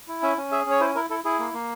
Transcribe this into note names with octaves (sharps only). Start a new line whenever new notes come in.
E4
C#4 E5
C#4
G#4 E5
C#4 C#5
E4 C5
E4 A#4
E4 A4
E4 G#4
A#3
A#3